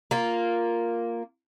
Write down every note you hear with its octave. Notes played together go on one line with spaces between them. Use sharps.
A#3 F4